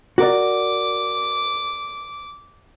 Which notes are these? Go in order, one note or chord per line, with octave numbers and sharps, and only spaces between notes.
F#4 A#4 D5 D6